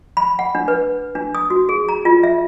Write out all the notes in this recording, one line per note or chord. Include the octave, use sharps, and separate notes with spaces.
B5
F#5
D4
B4
D4
D#6
F#4
G#4
A#5
F4
E5